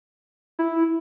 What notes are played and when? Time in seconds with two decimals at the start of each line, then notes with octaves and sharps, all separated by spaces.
0.59 E4